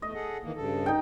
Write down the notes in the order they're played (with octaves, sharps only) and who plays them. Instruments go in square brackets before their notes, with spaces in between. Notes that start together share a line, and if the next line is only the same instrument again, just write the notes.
[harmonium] E2 A3 [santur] D#5
[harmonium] G#4 A4 F#5
D#3 E3 A#3
G2 C#3 A4
[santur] D#4 G5